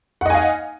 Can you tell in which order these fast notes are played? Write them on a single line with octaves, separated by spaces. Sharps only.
F#5 D#5 G#5 F5